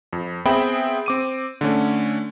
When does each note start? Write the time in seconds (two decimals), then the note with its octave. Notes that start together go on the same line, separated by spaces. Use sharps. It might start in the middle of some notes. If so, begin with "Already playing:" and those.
0.13 F2
0.46 B3 C4 G#4 E5 G5 B5
1.06 C4 D6 D#7
1.61 D3 A3 C#4